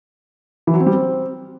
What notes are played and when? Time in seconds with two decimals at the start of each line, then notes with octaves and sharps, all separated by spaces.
0.67 E3
0.74 F#3
0.80 C4
0.86 G3
0.93 C4